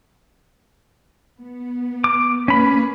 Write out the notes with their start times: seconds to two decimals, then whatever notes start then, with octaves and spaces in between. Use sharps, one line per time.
1.40 B3
2.04 D6
2.48 A#3 C#4 B4 B5